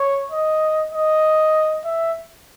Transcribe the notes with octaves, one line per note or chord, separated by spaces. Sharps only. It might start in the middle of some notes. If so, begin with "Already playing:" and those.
Already playing: C#5
D#5
D#5
E5